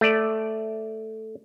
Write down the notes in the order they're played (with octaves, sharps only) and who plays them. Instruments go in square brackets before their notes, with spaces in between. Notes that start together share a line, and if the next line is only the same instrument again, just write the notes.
[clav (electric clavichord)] A3 D5